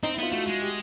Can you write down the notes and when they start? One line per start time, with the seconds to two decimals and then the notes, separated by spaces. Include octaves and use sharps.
0.03 C4 D#4
0.14 E4
0.18 B3 F4
0.32 A3 F#4
0.48 G#3
0.62 G4